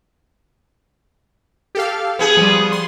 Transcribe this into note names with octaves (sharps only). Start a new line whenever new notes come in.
G4 A4 F5
B3 G#4
F3 G3
C6